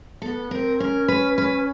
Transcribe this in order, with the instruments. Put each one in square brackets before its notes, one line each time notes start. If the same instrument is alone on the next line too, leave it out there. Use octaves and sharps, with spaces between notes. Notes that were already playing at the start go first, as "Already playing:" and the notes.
[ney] B3 [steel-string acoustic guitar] A4
[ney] C4 [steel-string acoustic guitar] A#4
[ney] C#4 [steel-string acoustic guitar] A#4
[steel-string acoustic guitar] B4
B4